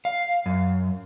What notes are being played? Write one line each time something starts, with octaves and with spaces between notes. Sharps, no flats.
F5
F#2